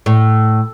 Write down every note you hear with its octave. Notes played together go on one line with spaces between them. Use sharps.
A2